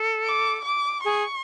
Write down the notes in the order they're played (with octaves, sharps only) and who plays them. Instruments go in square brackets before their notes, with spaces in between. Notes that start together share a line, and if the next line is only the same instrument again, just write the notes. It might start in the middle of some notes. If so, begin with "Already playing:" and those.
Already playing: [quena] A4
[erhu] D6
D6
[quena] G#4 [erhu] C#6